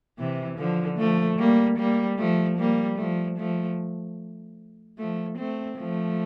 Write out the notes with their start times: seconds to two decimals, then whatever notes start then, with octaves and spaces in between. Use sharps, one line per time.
0.18 C3 E3
0.58 D3 F3
0.99 F3 A3
1.39 G3 A#3
1.78 G3 A#3
2.19 F3 A3
2.59 G3 A#3
2.98 F3 A3
3.38 F3 A3
4.98 F3 A3
5.38 A3 C4
5.78 F3 A3